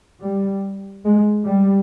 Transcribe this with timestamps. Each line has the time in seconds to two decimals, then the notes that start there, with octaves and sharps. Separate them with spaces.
0.23 G3
1.05 G#3
1.46 G3